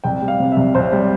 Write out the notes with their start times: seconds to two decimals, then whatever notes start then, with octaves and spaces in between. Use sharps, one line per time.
0.04 C2 G5
0.22 G3
0.28 F5
0.40 C3
0.52 E5
0.57 C2
0.75 C2 C5
0.92 G3